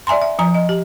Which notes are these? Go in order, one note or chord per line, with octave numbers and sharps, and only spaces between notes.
D5 E5 G#5 A#5 C6
E5
F3 G#5 A#5
D#5
G4